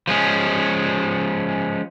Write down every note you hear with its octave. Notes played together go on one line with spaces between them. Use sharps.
F3 G#3 C#4